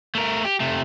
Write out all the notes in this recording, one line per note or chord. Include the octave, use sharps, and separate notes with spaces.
A3 A#4
G4
C3 A3